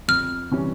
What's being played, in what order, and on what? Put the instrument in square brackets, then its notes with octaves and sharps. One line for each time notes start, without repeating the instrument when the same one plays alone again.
[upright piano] F2 [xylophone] F6
[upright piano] C3 E3 G3 C#4